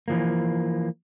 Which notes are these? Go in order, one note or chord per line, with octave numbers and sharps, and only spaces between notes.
E3 F3 A#3